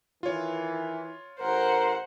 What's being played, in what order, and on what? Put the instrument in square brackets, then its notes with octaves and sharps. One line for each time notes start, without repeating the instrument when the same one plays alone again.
[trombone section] D#3 E3 [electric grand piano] F4 C#5
[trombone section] A1 A#4 [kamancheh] C5 F#5